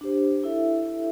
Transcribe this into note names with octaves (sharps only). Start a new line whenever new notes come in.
D4 G4 C5
E4 A4 E5